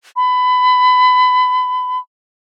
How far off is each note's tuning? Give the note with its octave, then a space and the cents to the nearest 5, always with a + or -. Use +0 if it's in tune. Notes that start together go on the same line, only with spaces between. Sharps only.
B5 +25